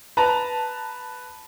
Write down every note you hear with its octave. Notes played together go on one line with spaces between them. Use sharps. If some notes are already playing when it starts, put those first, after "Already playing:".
B4 A5 A#5